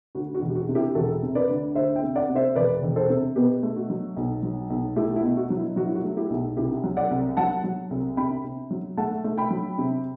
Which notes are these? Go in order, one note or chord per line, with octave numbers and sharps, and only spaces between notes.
D2 F#4
F#4
E1
G4
F#4
C3
E4 G4
E1 F#4 A4
C3
B4 D5
D2
D2 C5 E5
E5 G5
C3
D5 F#5
C3
C5 E5
E1 B4 D5
E1
A4 C5
C3
B2 G4 B4
A3
F#4
F#3
B1
F#3
B1
A3 E4 G4
E4
B2
F#4
F#3
E4
F#3 F#4
E4
F#4
A3
E4 G4
B1
C2 E4 G4
F#3
D5 F#5
C2
F#3 F#5 A5
F#3
C2
C3 G5 B5
C3
F#3
A3 F#5 A5
A3
G5 B5
F#3
C3